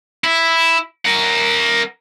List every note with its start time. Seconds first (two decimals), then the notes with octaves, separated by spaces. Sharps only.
0.24 E4
1.05 A#4 F#5